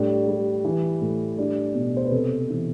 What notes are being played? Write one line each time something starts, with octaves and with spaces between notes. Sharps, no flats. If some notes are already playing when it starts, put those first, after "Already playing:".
Already playing: A2 G3 D4
G3
E3
A2
G3 D4
B2
C5
B4
C3 A4
E3